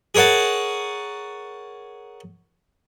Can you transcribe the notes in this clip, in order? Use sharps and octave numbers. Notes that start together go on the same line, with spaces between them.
G#4 A#4 C#5 F#5 A5